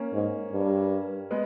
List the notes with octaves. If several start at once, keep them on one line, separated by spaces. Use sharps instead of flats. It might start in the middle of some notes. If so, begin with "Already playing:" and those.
Already playing: A#3 C#4
G#2
G2
G#3 B3